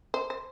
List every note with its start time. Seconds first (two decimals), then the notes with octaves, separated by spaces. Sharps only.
0.14 C5
0.30 C5